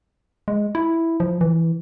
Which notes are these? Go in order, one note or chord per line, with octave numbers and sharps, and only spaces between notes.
G#3
E4
F3
E3